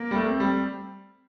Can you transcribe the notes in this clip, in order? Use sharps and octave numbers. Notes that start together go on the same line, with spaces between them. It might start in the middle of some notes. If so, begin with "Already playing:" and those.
Already playing: A#3
G3
A3
C4
G3